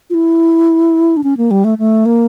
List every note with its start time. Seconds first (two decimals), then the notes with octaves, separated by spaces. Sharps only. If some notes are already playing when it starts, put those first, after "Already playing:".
0.10 F4
0.14 E4
1.17 D4
1.24 C#4
1.37 A#3
1.51 G3
1.64 A3
1.79 A3
2.06 A#3